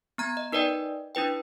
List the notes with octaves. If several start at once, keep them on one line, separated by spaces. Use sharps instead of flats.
B3 A#5 G#6
D#5
D#4 A#4 B4 D5 D#5 G5
D4 E4 B4 G5